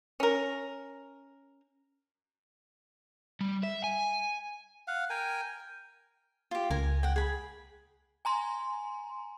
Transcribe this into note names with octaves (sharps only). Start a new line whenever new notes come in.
C#4 A#4
G3
E5
G#5
F5 F#5
A#4 G5 G#5
F4 G4
C#2 A#4 G#5
F#5 G5
G#4 B5
G#5 A#5 C6